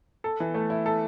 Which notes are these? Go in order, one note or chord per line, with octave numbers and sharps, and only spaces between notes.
A4
E3
A3
E4
A4